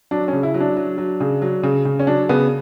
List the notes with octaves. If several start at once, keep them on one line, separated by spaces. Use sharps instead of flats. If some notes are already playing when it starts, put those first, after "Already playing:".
F#3 D4
C#3 C#4
E4
F#3
D4
F#3
F#3
C#3
F#3
C#3
C#3
C#4
F#3 D4
C#3 B3